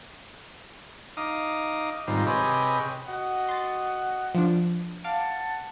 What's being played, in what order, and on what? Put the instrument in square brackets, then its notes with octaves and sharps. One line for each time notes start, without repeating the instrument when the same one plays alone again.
[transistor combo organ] D#4 F5 D6 D#6
G#2 D#3 G3 C4 F4
C3 G4 G#4 B4 C#5 D#5
[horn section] F#4 D#5 F#5
[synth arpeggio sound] C6 A6
F3 D4
[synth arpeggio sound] F5 D6 [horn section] F#5 A5